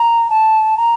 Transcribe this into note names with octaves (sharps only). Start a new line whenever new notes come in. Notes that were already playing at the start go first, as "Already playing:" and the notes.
Already playing: A#5
A5
A#5